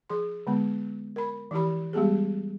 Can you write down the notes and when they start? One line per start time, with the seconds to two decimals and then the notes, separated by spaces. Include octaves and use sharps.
0.10 F3 G#4 C6
0.47 D3 G#3 B3
1.16 A#4 B5
1.51 E3 F3 E4 G4 B5
1.93 G3 G#3 B3 G4 G#4